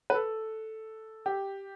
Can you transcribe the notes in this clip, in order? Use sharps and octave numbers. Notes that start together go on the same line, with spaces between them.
B4
A4
G4